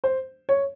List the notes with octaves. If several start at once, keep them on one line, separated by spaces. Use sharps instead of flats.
C5
C#5